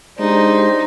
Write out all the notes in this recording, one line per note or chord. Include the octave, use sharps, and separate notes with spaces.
G#3 D4 D#4 G4 C5